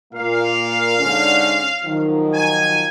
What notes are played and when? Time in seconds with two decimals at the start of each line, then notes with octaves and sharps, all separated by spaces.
0.13 A#2 A#3 F5
0.99 G#2 D3 C#4
1.84 D#3 F3 F#3
2.33 G#5